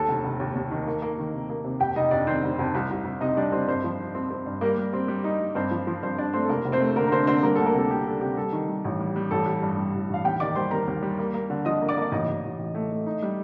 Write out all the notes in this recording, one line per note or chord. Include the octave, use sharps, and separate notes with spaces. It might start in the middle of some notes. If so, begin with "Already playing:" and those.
Already playing: D#2 A4 A5
F1
F1
D#2
D#2
D#3
A#3
A#3
D#3
C3
A#3
C3
F2 G4 G5
F1 D#4 D#5
F2 D4 D5
D#3 C4 C5
F1
F2
C2
C2
C2
C3 D#4 D#5
G3 D4 D5
C2 C4 C5
G2 C4 C5
F3
D#4
C4
C4
G2
G3 A#3 A#4
G3
C4
G3
D#4
G3
G2 C4 C5
F3
F3
G2 C4 C5
G2 D4 D5
A3 C4 C5
A4
F1 A#3 A#4
F1
C4 C5
A3
D3 A#3 A#4
A#4
D3 C4 C5
D3 C4 C5
G3 A#3 A#4
D2 A4
A#3 A#4
C3 A4
G3 G4
D4 A4
C3 G4
G3 A4
D#3
G3
A1
G3
G3
A1 A4
G3
G2
G3
A1
A1 F5
D#2 G4 G5
D#3 D5 D6
G3 C5 C6
D#2 A#4 A#5
D#2
G3
A#3
A#3
D3
F3 D#5 D#6
A#3
D5 D6
A#3
D5
A1 D#4 D#5
A1
A1
A1
A3
A3
D#4
G3